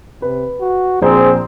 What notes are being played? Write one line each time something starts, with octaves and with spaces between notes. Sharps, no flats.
C3 B4
F#4
A#1 C4 G#4 C5 A#5